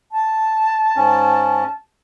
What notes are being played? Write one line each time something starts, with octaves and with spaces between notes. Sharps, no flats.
A5
G#2 C#4